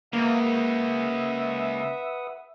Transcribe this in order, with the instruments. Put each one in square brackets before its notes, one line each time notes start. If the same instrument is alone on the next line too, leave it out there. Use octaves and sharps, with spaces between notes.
[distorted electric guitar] C#3 G#3 [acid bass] A#3 [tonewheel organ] B4 F#5 D#6 [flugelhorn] E5